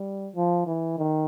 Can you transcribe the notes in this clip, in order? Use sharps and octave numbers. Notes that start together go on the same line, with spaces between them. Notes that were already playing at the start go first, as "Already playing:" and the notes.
Already playing: G3
F3
E3
D#3